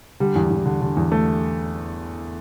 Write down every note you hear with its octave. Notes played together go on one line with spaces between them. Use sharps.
D3 G3
E2
E2
D3
D3
E2
A3